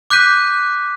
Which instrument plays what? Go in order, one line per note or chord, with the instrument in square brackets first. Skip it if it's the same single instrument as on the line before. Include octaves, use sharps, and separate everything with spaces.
[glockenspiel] D6 F#6 G6 B6 D#7